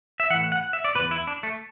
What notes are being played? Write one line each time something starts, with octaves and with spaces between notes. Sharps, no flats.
E5
A2 E3 F#5
F#5
E5
D5
B2 B4
E2
E4
D4
A3